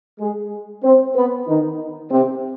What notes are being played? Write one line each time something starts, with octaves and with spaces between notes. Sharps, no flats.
G#3 G#4
C4 C5
B3 B4
D#3 D#4
C3 C4